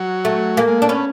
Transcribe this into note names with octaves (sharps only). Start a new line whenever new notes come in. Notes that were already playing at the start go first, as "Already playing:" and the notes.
Already playing: F#3
A3
G#3 A#3
G#3
A3 D4
B3 C#4